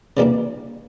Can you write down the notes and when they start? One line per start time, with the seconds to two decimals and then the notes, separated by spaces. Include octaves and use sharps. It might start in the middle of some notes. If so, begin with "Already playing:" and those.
0.17 C#3 E3 G3 A#3 D4